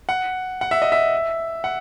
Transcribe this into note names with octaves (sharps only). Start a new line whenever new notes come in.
F#5
F#5
E5
D#5
E5
F#5